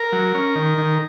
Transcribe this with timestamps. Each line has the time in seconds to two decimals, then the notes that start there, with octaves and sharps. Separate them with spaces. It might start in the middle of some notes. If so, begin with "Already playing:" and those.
Already playing: A#4
0.12 F#3
0.35 C#4
0.55 D#3
0.78 D#3